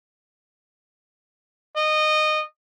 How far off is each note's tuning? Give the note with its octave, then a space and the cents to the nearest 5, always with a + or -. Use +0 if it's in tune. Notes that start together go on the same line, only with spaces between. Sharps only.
D#5 -20